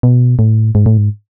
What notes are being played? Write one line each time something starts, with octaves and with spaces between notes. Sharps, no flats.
B2
A2
G#2
A2
G#2